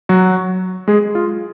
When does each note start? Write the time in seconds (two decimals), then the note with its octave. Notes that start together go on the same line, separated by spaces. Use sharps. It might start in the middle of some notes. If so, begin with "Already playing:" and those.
0.09 F#3 F#4
0.88 G#3 G#4
1.15 F4